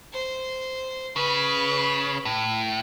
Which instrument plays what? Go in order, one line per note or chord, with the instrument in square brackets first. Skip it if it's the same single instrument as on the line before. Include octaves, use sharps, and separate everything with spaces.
[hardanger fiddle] C5
[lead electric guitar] C#3 [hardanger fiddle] B4
[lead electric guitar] A2